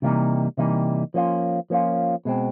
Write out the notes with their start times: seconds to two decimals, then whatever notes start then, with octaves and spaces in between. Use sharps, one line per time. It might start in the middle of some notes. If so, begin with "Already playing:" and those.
0.02 C3 E3 G3 A#3 D#4
0.57 C3 E3 G3 A#3 D#4
1.14 F3 A#3 C#4 F4
1.70 F3 A#3 C#4 F4
2.25 B2 G#3 C4